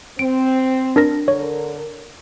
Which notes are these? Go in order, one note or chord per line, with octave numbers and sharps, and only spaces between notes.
C4 D7
D4 A#4 A#6
D3 A#4 C#5